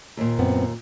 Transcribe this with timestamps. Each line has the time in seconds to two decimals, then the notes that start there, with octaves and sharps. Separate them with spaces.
0.17 D#2 A#2
0.39 F#2 B3 C4